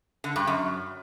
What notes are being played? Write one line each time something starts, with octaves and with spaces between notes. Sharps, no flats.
D3
G2
F#2